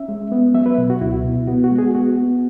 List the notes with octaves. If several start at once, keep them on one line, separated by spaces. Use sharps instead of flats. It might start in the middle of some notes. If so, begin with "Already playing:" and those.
Already playing: C#4 E5
G#3
B3
F#3 E5
B4
B2
F#4
C#2 E4
B2
B3 F#4
F#4
G#3
G#4
B3 F#4
B3